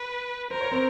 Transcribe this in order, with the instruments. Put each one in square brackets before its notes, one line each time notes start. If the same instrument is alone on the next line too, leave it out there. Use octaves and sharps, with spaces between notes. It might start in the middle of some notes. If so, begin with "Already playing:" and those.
Already playing: [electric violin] B4
[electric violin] A#4 [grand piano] C5
[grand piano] C#5
C4 C5